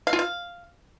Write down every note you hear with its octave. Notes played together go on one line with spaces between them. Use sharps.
F5
F4
F5